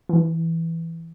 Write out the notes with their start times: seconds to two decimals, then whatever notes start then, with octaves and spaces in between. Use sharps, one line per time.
0.09 E3